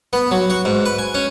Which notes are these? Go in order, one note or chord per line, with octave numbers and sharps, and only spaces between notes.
B3
F#3
F#4
G#2
B4
G#5
C#4